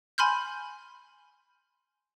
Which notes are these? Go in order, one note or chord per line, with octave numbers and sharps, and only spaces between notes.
G#5 B5 C6 F6 G6